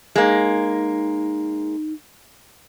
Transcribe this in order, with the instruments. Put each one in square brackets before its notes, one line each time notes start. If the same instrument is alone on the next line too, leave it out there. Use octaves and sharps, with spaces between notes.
[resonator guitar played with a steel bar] G#3 A#3 [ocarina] D#4